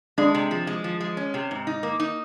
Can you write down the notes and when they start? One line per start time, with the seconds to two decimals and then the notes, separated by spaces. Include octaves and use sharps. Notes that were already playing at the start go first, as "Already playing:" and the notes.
0.18 G#3 D4
0.34 C3
0.51 F3
0.67 G#3
0.84 F3
1.00 G#3
1.17 C#4
1.34 C3
1.51 G#2
1.67 D#4
1.83 A#3
2.00 D#4